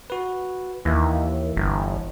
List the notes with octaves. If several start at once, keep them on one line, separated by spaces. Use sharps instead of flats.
F#4 B4
D#2 E3 E5
G1